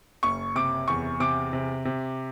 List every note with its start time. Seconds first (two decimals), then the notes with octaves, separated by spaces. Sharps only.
0.23 F#1 C#6
0.55 C3 D6
0.88 E2 C#6
1.20 C3 D6
1.53 C3
1.85 C3